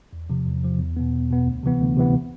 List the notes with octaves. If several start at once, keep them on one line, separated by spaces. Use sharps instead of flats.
E2
C3 F3
E2
C3 F3
E2
B2 B3
E2
B2 B3
D2
C3 E3 B3
D2
C3 E3 B3